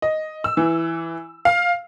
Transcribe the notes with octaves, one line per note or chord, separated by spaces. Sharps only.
D#5
E6
E3
F5